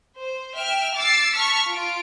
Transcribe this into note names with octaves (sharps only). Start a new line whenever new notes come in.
C5
E5 G5 F6
D6 E6 A6 C7
A5 C#6 F6 B6 C#7
F4 D7